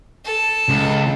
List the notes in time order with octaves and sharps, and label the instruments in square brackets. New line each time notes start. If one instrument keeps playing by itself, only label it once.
[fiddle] A4
[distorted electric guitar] C#2